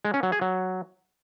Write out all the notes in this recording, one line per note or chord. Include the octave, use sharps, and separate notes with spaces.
G#3
C#4
F#3
G#4
F#3